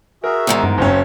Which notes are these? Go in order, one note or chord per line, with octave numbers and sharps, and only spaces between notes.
F#4 G#4 A#4 E5
E2 G#2 D#3
G2
F#1 C4 C#4 C5